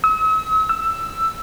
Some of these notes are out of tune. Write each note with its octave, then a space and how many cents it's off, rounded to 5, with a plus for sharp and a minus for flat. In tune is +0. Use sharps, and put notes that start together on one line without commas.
E6 -45
E6 +10